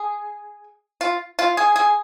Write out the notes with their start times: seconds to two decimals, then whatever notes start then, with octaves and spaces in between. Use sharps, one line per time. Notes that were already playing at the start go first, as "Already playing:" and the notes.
Already playing: G#4
1.01 F4
1.39 F4
1.57 G#4
1.76 G#4